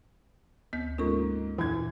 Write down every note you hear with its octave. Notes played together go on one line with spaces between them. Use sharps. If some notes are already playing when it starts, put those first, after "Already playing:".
D2 B3 G6
G#2 A#3 C#4 F4 A4 C#6
F2 A#2 E3 G#6